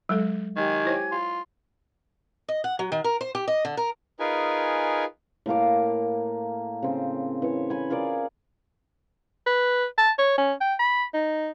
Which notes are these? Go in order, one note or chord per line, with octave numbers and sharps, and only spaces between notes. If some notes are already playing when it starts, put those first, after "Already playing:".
F#3 G#3 A4
D#3 G4 G#5 G#6
E4 C5 C#5
F4
D#5
F#5
F#3
D#3
A#4
C5
G4
D#5
D3
A#4
D#4 F4 G#4 A#4 B4 G#5
A2 A#3 F5 D6
C#3 C4
E3 C#5
G#5 B5
F4 G#4 A#4 D5
B4
A5
C#5
C#4
G5
B5
D#4